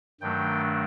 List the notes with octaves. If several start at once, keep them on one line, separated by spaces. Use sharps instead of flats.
G2 D#3 F#3 A3 D4 G5